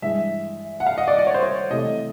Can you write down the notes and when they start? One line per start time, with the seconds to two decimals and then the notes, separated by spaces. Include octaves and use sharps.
0.02 G2 E3 G#3 E5
0.80 F#5
0.87 F5
0.98 D#5
1.08 D5
1.19 D5
1.27 C#5
1.34 C5
1.43 C#5
1.70 C3 E3 A3 C4 D#5